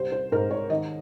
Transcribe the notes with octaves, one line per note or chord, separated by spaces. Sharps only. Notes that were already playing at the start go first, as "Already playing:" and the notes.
Already playing: C2 G3 C5
C5
G#2 A#4
C#5
D#3 D#5